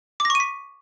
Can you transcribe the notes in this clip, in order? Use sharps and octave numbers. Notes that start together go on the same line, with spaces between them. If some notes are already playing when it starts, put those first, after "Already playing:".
D6
A#6
C#6
D#7
B6